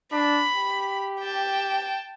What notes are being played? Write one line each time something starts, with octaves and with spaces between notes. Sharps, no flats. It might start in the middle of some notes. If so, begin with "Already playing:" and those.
D4 B5
G4
G5 A5